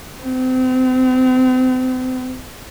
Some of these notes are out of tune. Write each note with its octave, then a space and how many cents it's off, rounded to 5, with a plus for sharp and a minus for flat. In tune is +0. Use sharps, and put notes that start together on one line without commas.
C4 -35